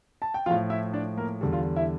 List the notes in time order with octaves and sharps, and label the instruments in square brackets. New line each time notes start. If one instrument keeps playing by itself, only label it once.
[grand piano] A5
G5
F3 F4 F5
A2
E4 E5
D4 D5
A#3 A#4
E2 D3 G3
F4
E4 E5